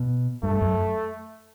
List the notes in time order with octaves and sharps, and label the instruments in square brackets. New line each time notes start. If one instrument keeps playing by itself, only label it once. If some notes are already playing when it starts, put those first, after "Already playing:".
Already playing: [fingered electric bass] B2
[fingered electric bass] G2 [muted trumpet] A3
[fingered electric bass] F#2